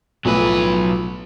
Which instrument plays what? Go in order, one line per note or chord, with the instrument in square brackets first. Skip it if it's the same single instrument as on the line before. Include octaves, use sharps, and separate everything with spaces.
[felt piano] B1 A2 F3 [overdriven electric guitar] F#3 B4